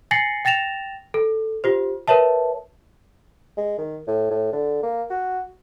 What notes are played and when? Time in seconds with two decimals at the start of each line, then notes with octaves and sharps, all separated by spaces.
0.11 G#5 A6 A#6 C7 C#7 F#7
0.45 G5 A6 A#6 E7 F7
1.14 A4
1.64 F4 G4 C5
2.08 A#4 B4 C#5 E5 A5
3.58 G#3
3.78 D#3
4.08 A2
4.31 A2
4.53 D3
4.83 A#3
5.10 F#4